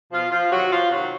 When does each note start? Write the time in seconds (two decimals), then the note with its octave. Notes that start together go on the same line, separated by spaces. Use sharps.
0.12 B2 F3 F4
0.32 F3 F4
0.52 C3 D#3 F#3 F#4
0.71 F3 F4
0.91 C3 D#3 F#3 F#4